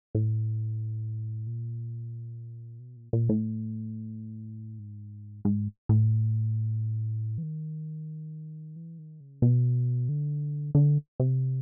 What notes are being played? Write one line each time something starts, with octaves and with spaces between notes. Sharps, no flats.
A2
A#2
B2
A#2
A#2
A2
G#2
G#2
A2
E3
D#3
E3
D#3
C#3
B2
D3
D3
C3